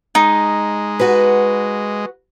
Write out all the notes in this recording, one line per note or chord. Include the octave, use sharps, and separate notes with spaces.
G#3 D#4
F#4 B4